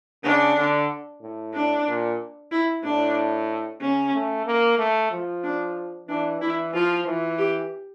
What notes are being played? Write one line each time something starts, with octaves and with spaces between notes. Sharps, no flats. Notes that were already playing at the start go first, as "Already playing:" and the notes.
C#3 D4
D3
A2
D4
A#2
E4
A2 D4
C#3 C#4
A3
A#3
A3
F3
D4
E3 D4
E3 E4
F3 F4
E3
G4